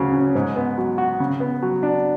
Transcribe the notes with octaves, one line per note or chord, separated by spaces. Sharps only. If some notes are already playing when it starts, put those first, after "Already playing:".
Already playing: D2 C#3 F#3
C#4
G#2
B3
F#3
F#4
C#3
B3
F#3
D4